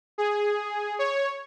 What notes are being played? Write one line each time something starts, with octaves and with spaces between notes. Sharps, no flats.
G#4
C#5